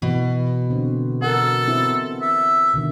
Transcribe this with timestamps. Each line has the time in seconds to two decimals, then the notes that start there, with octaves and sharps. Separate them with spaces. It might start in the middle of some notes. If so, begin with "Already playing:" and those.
0.02 B2 E3
0.70 D3 C4
1.22 F#4 A4 A#4 F#5
1.67 B3 C4 E4
2.21 E5
2.74 B2 D3 D#3